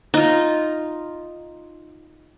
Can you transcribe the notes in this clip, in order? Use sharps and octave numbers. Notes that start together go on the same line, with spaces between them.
D#4 F4